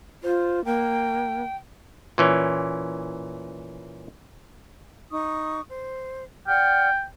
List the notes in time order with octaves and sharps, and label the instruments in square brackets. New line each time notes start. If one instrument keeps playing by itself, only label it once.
[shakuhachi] F4 [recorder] C5
[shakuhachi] A#3 [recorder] G5
[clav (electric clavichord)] A#2 E3 C#4
[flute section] D#4 C#6 D#6
C5
[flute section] D5 F#5 F6 [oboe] G5